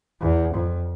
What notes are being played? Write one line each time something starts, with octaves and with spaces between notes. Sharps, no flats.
E2
F2